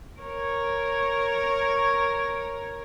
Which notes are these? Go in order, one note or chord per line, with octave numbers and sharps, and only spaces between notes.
A#4 C#5